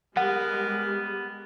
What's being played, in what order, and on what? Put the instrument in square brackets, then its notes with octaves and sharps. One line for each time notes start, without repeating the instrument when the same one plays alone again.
[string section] G3 G#3 [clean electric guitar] B3 [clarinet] A#4 [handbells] F#5